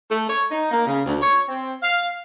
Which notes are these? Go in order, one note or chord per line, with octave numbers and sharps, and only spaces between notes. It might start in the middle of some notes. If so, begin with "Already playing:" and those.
A3
C#5
D#4
A#3
C#3
D2
C#5
C4
F5